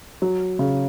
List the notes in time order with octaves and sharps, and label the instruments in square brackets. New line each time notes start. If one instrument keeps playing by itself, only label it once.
[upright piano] F#3
C#3